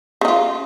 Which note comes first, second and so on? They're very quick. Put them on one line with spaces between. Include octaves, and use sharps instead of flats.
C#3 D#4 F4